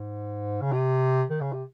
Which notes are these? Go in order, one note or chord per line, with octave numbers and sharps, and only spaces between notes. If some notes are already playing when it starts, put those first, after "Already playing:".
Already playing: G#2
C#3
C3
D#3
C#3
C3